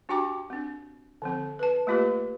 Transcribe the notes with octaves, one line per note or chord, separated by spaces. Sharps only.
D4 F#4 G4 G5 A#5 D6
C4 D4
D3 F3 C4
B4 A5
A3 A#3 F4 G4 B4